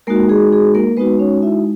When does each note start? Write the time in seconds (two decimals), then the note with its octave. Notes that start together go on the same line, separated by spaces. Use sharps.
0.07 G#3 A#3 D#4 F#4 A#4
0.29 G#4
0.52 G#4
0.75 A#3 A#4
0.97 G#3 B3 D#4 F#4 B4
1.19 C#4 C#5
1.42 E4 E5